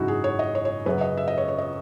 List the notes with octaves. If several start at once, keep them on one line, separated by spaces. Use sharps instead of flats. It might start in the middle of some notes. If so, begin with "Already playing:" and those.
Already playing: G#1 F#2 C#3 D#4 E4 F#4
G#4
C#5
D#5
C#5
C#5
F#2 C#3 F#3 B4
D#5
E5
D#5
C#5
C#5
D#5